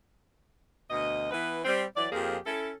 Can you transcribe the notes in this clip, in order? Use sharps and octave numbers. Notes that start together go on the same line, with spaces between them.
D2 B2 D#5
E3 B3 B4
G3 C4
E3 F#3 D5
F2 F3 A#3 G4 G#4
C#4 E4 A4